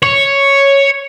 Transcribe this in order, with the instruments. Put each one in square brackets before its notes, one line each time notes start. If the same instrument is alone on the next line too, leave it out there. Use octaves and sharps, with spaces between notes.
[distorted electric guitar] C#5